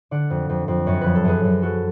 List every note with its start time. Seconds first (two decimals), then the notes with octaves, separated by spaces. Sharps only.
0.11 D3 D5 F#5
0.30 F2
0.49 F2
0.68 F2
0.87 F#2 C#5
1.01 F3 B4
1.15 A4
1.24 F#2 G#4 B4
1.44 F#2
1.62 F#3 F#4 A4